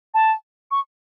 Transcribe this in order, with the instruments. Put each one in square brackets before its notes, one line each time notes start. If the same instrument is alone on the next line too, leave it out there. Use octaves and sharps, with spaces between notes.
[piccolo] A5
C#6